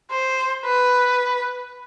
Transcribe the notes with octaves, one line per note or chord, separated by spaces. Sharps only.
C5
B4